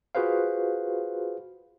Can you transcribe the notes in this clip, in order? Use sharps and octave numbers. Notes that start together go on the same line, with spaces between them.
F4 F#4 G#4 B4 C5 F5